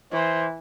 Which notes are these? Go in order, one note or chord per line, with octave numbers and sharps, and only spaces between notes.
E3 C5